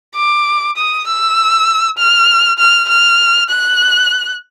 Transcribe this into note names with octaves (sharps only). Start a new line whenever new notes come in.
D6
D#6
E6
F6
F6
F6
F#6